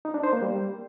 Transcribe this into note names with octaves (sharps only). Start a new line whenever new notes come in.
D#4
D4
C5
A#3
G3